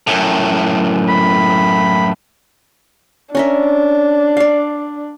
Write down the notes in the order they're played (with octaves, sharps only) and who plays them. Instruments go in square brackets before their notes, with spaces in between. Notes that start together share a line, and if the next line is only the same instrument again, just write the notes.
[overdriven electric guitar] F#2 A2
[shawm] B5
[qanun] C#4 A#4 E5 [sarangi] D4
[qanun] D5 F5